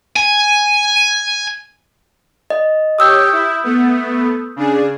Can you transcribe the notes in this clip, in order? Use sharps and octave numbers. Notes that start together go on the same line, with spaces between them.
G#5
D#5
G4 C#5 G5 D#6 E6 G6
E4
A3 B3
C#3 D4 G#4